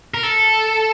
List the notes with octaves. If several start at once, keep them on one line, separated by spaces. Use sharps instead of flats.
A#4
A4